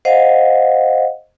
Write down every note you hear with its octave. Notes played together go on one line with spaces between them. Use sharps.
C5 D#5 F5 F#5